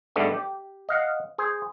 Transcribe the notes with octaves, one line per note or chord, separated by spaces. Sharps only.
G#2 D3 G3 A3 B3
G4
D#5 F5 F#5
G#4 C5